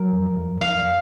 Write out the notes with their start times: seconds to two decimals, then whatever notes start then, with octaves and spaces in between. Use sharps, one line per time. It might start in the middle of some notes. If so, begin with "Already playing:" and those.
Already playing: F#3 A#4
0.13 F2
0.37 F2
0.61 F2 F5